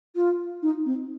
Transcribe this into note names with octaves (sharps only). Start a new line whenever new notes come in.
F4
D#4
C4